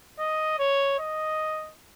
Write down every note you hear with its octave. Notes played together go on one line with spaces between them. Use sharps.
D#5
C#5
D#5